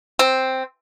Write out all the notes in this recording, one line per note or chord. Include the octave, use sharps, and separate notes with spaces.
C4